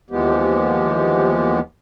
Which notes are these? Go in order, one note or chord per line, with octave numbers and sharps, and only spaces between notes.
D#2 E3 F3 G#3 B3 G4